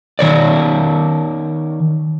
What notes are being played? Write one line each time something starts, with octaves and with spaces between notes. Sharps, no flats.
D#3 C#5 D5